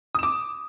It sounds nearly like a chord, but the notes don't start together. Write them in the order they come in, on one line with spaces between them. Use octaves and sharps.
D#6 E7 D6